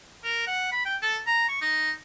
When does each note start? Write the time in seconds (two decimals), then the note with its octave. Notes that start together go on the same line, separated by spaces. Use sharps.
0.24 A#4
0.47 F#5
0.72 B5
0.85 G5
1.02 A4
1.27 A#5
1.49 C#6
1.61 D#4